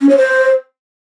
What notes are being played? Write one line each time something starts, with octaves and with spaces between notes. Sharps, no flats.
C#4
C#5
C5